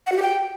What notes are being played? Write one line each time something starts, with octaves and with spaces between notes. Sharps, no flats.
F#5
F#4
G4
G5